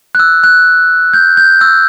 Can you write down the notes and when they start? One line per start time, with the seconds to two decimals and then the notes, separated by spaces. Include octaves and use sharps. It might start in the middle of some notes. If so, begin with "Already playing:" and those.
0.15 F#6
0.19 E6
0.44 F#6
1.13 G6
1.37 G6
1.61 E6